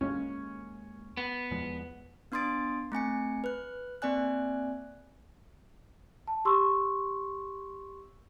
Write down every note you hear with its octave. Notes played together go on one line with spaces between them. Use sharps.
D#2 G#3 A#3 C#4
B3
E2 F3 G#3
B3 D4 C6 D#6 A6 D7
A3 C4 G#5 C#7
B4 F#6
A#3 C4 D5 G#5 F#6
A5
G4 C6 C#6 E6